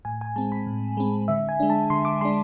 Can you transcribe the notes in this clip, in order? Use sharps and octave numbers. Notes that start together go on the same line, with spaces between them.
A2 G#5
G#5
G#3 C4 A5
B5
A2
G#3 C4
D3 E5
G#5
G#3 D4
A5
D3 C6
D6
G#3 D4 C6